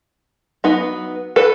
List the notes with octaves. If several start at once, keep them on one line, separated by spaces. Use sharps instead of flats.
F#3 B3 D#4
A4 B4